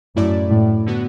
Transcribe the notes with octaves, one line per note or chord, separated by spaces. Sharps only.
F#2 A2 A3 E4 D5
A2
D3 B3 F#4